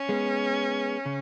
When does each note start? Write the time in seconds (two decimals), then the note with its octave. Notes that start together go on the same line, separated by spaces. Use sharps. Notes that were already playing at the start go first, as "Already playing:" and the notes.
Already playing: C#4
0.09 G#3 B3
1.06 C#3